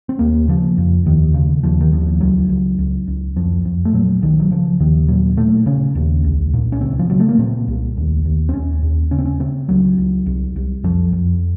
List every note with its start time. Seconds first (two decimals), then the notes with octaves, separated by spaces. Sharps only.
0.09 C4
0.19 D#2 A#3
0.48 C#3 F3
0.78 F2
1.05 D#2 D#3
1.34 C#3
1.63 D#2 F3
1.81 D#3
1.92 D#2 F3
2.20 C#2 F#3
2.49 C#2
2.79 C#2
3.07 C#2
3.36 F2 F3
3.65 F2
3.85 A3
3.93 A#2 F#3
4.22 C2 D#3
4.40 F#3
4.51 C#3 F3
4.80 D#2 D#3
5.08 A#2 F#3
5.37 A#2 A3
5.66 C#3 C#4
5.95 D#2
6.24 C2
6.53 A#2
6.72 C#4
6.81 C#2 C4
6.99 F3
7.10 C#3 F#3
7.20 A3
7.29 A#3
7.38 A#2 C4
7.68 C2
7.97 D#2
8.25 D#2
8.49 C4
8.54 D#2 C#4
8.83 D#2
9.11 C#3 C#4
9.19 C4
9.25 C#4
9.40 C#3 C4
9.69 C#2 F#3
9.98 C#2
10.26 C2
10.56 C2
10.84 F2 F3
11.13 F2